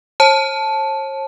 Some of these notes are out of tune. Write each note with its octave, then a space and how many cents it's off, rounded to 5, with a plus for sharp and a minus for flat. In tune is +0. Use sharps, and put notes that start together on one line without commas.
C#5 -45 A5 -10